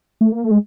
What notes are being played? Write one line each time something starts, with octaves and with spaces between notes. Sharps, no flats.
A3
A#3
A3
G#3